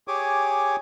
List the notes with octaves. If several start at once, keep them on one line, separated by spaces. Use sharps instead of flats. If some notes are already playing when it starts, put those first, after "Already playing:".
G4 G#4 C#5 G#5 D6